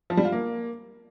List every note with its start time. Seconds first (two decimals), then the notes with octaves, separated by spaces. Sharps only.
0.10 F3
0.17 G3
0.25 F4
0.32 A#3